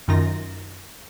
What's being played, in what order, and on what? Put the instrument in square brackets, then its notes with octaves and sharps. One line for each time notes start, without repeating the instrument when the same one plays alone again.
[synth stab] F#2 D#3 D#4 F4 A#6